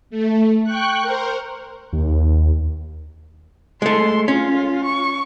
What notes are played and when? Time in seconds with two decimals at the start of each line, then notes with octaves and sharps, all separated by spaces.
0.10 A3
0.64 G5 C#6 F#6
1.01 A#4 C5
1.93 D#2
3.82 G#3 A3 C6
4.28 C#4 F4
4.85 C#6